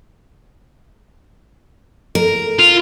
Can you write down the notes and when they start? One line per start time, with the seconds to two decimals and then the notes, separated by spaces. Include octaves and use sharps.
2.15 A#4
2.59 F4